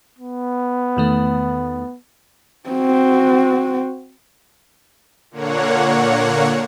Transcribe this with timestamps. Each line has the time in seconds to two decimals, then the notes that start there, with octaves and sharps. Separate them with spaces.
0.19 B3
0.97 E2 D#3 A3
2.70 C4 F#4
5.31 A#2 D3 A#3 C#5 F#5